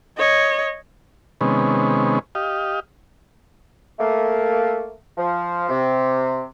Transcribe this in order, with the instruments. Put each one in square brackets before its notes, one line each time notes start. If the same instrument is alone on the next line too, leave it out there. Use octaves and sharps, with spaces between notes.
[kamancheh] C#5 D#5
[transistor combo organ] C3 D#3 G#3 B3 C#4
G4 D#5 F5
[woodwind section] A3 A#3
F3
C3